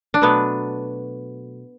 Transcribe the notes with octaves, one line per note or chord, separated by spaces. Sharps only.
D4
B2 F#3 A3 B3